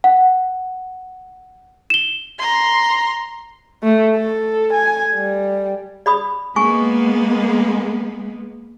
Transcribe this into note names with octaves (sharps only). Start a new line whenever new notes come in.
F#5
E7 G7
A#5 C6
A3
A4
G#5
G3
D5 B5 D#6
G#3 A#3 B3 G#5 C#6